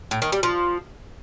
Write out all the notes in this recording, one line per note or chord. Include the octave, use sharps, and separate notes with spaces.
A2
D#3
G3
F3